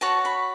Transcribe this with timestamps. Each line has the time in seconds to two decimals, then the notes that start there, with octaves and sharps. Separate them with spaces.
0.01 F#4 C#5 A5
0.25 B5